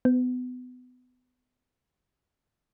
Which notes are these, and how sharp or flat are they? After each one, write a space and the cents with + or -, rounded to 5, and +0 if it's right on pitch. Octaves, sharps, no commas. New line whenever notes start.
B3 +25